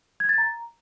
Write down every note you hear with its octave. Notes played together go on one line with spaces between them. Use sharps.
G#6
A6
A#5